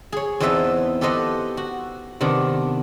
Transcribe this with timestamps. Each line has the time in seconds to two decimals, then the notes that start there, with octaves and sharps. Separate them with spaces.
0.12 G#4 C#5
0.40 E2 C4 D#4 B4 E5 A5
1.01 G4 A4 B4 C5 D#5 F#5
1.57 F#4
2.21 C3 D#3 B3 D4